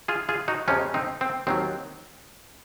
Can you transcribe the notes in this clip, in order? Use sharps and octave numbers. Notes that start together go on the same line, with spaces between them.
F4 G#4
F4 G#4
D#4 F#4
F2 C3 F3 G#3 C#4 F4
C4 D#4
C4
D#2 D#3 F#3 C4